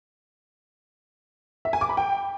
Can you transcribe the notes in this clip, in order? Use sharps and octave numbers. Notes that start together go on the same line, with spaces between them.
E5
G#5
D6
B5
G5